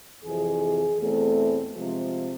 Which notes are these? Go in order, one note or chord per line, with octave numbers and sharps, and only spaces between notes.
F2 C3 E3 G#4
E2 B2 A3 C4
C3 F3 G#3